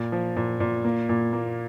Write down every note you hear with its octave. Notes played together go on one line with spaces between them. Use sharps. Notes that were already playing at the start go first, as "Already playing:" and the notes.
Already playing: A#2
F3
A#2
A#2
A#3
A#2
A#3